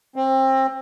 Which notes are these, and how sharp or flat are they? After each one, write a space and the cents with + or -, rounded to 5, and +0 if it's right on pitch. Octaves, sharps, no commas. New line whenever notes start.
C4 +25